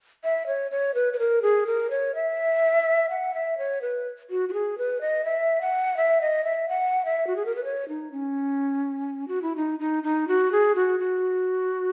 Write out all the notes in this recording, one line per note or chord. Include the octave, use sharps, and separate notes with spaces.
E5
C#5
C#5
B4
B4
A#4
G#4
A#4
C#5
E5
F#5
E5
C#5
B4
F#4
F#4
G#4
B4
D#5
E5
F#5
E5
D#5
E5
F#5
E5
F#4
G#4
A#4
B4
C#5
D#4
C#4
F#4
E4
D#4
D#4
D#4
F#4
G#4
F#4
F#4